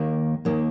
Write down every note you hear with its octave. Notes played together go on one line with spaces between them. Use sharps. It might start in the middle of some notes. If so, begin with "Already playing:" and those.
Already playing: D#2 D#3 A#3
D#2 D#3 A#3